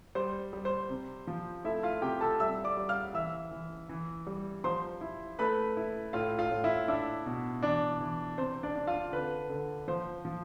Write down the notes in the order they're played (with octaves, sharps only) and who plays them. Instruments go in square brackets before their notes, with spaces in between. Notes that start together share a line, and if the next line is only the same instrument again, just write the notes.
[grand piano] G3 C5
G3
C5
C3
F3
A3 E4 E5
F4 F5
C3 G4 G5
A4 A5
G3 E5 E6
D5 D6
G3
F5 F6
E3 E5 E6
E3
E3
G3
F3 C5 C6
E4
A3 B4 B5
E4
A2 F4 F5
F4 F5
A2
E4 E5
D4 E4 E5
B2
E3 D4 D5
E3
C3 C5
D4 D5
D4
F4 F5
D3 B4
D3
F3 C5
F3